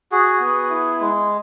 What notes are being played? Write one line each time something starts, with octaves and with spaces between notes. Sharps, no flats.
F#4 G#4
B3
E4
G#3